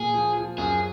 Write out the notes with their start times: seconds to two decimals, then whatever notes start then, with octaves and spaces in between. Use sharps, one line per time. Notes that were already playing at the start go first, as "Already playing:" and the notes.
Already playing: A#2 G#4
0.14 F3
0.35 F3
0.58 F#2 G#4